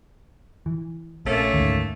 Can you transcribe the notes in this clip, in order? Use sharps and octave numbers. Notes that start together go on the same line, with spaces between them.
E3
A#1 C3 A3 A#3 C#4
D2 G#2 D#3